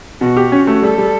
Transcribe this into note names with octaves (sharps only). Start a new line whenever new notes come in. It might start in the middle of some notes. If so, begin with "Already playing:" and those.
B2 F#4
G4
C#4
A3
G3 A4
G3